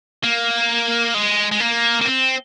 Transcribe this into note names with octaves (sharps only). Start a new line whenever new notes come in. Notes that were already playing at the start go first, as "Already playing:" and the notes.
A#3
G#3
G#3
A#3
A#3
C4